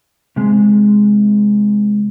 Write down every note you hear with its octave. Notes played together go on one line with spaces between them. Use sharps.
C3 G#3